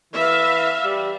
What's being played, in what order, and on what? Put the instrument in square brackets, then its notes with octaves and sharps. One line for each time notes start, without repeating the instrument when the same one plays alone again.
[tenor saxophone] E3 [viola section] E5 F5
[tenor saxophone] G3